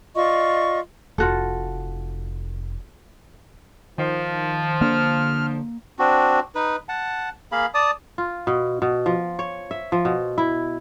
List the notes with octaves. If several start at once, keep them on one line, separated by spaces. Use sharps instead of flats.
F4 D5 D#5 C#6
F1 F4 F#4 A4
D#3 F3
D3 A#3 F6
C4 D4 F#4
D#4 B4
F#5 A5
A#3 G#4 F5 B5
D5 A5 D#6
F4
B2
B2
F3
C#5
E5
F3
B2
E4